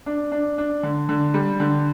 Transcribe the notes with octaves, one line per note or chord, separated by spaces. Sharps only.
D4
D4
D4
D3
D3
G3
D3